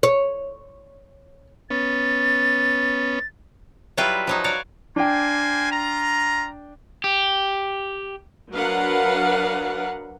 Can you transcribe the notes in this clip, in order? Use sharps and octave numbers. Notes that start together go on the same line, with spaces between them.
C#5
B3 C#4 A6
F#3 G3 E4 F4 B4
F3 F#3 D#4
F#4 C#5 D5 F5
A#3 D4 C5 G5 G#5
F4 A#5
G4
F#3 D4 A#4 B4 F5 F#5